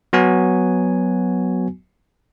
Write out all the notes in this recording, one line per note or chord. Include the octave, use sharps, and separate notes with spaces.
F#3 B3 F#4 G#5